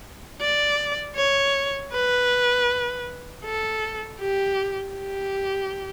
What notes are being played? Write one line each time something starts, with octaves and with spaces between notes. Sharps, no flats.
D5
C#5
B4
A4
G4
G4